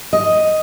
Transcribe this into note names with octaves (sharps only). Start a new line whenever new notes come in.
D#5